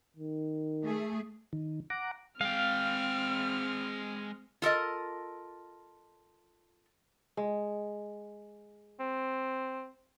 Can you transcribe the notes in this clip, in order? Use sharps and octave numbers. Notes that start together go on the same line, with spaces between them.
D#3
A3 G#4
D#3
F#5 A#5 D6
G#3 C4 F5 G5 F6
F4 A4 A#4 D#5
G#3
C4